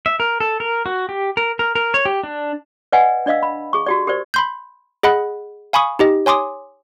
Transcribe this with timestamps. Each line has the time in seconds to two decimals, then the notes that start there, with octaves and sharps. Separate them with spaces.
0.06 E5
0.20 A#4
0.40 A4
0.60 A#4
0.86 F#4
1.09 G4
1.37 A#4
1.59 A#4
1.75 A#4
1.94 C#5
2.05 G4
2.23 D4
2.92 B4 D5 D#5 F#5 G#5
3.26 D4 D5 D#5 F5 E6
3.43 B5
3.73 G#4 C#6
3.86 F#4 G4 D5
4.07 G4 A#4 C5 D5
4.34 B5 C6 G6
5.03 G#4 D#5 F#5 B5 F#6
5.73 F5 G#5 B5 C#6 D#6
5.99 D#4 G4 D#5
6.26 C#5 G#5 C6 D6 D#6